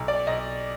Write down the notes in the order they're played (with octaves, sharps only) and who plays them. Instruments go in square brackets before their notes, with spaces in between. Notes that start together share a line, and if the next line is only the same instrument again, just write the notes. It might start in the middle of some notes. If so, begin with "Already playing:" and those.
Already playing: [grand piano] B1
D5
B1 D#5